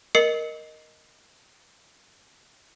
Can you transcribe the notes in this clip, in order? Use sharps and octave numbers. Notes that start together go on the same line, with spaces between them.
A#4 D#5 C7 C#7 F#7